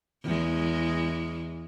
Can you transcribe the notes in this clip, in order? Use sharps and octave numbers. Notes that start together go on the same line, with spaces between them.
E2 G#3